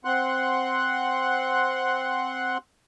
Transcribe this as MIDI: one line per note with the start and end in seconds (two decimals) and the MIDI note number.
0.05 2.58 60
0.05 2.58 78
0.05 2.58 84
0.05 2.58 90